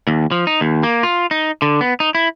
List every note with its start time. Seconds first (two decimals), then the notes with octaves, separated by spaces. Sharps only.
0.07 D#2
0.31 F3
0.47 D#4
0.61 D#2
0.83 A#3
1.03 F4
1.31 D#4
1.62 D3
1.81 B3
2.00 D#4
2.15 E4